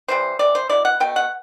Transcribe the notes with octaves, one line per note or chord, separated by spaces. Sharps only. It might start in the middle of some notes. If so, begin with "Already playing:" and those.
C3 E3 G3 C5
C3 E3 D5
C5
B2 A3 E4 D5
F#5
B2 A3 G5
F#5